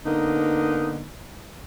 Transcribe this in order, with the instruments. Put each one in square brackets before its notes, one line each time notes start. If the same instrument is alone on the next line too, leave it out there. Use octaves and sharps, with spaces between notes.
[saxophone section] D3 A#3 B3 D#4